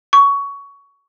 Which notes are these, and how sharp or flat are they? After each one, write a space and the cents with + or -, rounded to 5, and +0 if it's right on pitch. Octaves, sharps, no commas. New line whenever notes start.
C#6 +20